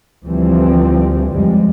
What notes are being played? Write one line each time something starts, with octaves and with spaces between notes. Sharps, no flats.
D2 E3 F3 G3 C4
F2 G3 G#3